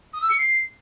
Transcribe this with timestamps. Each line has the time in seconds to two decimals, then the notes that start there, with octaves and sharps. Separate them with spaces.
0.13 D#6
0.21 E6
0.29 C#7
0.37 C7